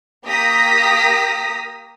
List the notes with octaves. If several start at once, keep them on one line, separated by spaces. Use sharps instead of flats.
A#3 G4 A#5 D#6 A#6 B6